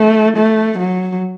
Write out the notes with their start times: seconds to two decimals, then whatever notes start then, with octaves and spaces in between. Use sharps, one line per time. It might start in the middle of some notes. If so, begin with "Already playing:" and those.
Already playing: A3
0.36 A3
0.79 F#3